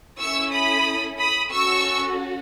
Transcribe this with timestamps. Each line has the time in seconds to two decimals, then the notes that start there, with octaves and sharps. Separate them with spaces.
0.19 C#4 E4 A4 C#6 E6
0.51 B5 D#6
1.17 B5 D#6
1.50 C#4 F#4 A4 C#6 E6